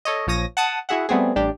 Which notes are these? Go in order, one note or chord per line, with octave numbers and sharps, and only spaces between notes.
A4 C#5 D#5
A#1 F3 C#5 D#6 A#6
F#5 A5 D#6
E4 F#4 G#4 E5 F#5
G3 A3 B3 C4 F#4 G#4
A1 G3 D4 G4